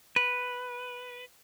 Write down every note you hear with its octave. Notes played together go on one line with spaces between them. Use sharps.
B4